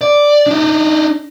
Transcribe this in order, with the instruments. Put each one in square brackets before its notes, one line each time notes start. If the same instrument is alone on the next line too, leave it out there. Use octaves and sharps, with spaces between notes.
[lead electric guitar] D5
D4 D#4